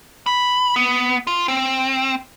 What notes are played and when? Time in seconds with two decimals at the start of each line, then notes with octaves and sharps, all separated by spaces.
0.26 B5
0.76 B3
1.27 F4
1.48 C4